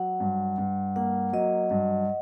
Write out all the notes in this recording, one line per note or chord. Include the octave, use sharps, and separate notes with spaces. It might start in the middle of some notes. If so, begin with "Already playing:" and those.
Already playing: F#3 F#5
G2
G2
A#3 F#5
F#3 D#5
G2